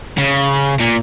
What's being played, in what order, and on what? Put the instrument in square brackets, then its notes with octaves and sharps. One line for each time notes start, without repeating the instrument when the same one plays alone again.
[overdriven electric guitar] C#3
A#2